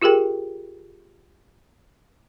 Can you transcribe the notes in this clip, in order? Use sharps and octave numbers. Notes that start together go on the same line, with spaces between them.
F4 G4 G#4 A#4 G5